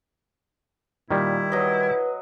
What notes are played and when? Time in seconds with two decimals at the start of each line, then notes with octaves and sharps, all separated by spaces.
1.11 A#2 D#3 G3 E4
1.52 F#3 B4 D#5